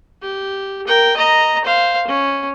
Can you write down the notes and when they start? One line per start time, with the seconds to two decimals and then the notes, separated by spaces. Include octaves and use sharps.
0.23 G4
0.87 A#4 G5
1.17 D#5 A#5
1.65 C5 F5
2.08 C#4